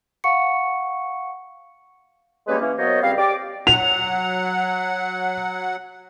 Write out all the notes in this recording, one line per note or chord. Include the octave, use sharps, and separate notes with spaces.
F5 F#5 C#6 C#7
G3 G#3 A#3 C#4 B4 C#5
E3 A#3 C#4
F#3 A#3 B3 C5 C#5 D#5
C#2 G3 C4 F5
G4 D5 D6
F#3 F#5 F7